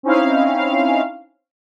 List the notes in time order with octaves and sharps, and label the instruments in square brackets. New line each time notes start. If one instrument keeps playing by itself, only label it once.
[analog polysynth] C4 C#4 D#4 E4 F5